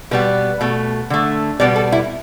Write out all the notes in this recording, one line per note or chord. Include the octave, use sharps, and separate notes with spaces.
B2 G3 B3 B4
B2 A3
D3 A3
B2 G3 B3 D5
A4
E4